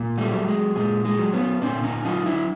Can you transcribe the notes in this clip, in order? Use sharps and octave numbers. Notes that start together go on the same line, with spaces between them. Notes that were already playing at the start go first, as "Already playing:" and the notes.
Already playing: A#2
G3 A3
F#3
G#3
A#2 G#3
G#3
F#3
B3 C#4
A#2 C4 D4
C#4 D#4
F#3 D#4 F4
D4 E4